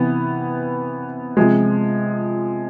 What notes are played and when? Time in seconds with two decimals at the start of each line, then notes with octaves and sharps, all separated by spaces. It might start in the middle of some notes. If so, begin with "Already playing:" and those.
Already playing: C3 E3 B3
1.37 C3 F3 G#3